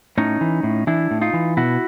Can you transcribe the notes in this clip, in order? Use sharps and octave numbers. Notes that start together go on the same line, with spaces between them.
A2 C#4 D#4
E3
A2
E3 D4 E4
A2
D#4 F4
E3
B2 E4 F#4